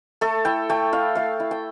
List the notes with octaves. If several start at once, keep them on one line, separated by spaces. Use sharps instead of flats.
A3 A4
E4 G5
A3 G5
E4 F5
A3 F5
E4
G5